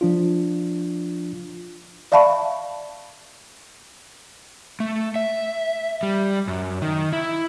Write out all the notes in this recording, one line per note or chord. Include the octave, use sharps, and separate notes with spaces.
F3 D4 F4
D5 E5 F5 A5 B5 C#6
A3
E5
G3
F#2
D#3
E4